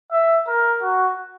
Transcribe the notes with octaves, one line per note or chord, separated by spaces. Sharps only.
E5
A#4
F#4